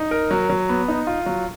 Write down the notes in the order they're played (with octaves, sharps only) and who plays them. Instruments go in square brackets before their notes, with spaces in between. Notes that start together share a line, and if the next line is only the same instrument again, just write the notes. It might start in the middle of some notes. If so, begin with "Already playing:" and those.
Already playing: [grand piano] D#4
A#4
F#3
F#3
B3
D#4
F4
F#3